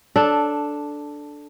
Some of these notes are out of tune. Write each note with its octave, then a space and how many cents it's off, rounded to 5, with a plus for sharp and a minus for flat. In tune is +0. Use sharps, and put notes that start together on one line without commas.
D4 +0 A4 -5